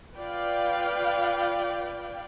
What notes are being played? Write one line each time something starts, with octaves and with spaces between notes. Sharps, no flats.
F4 B4 D5 F5 G5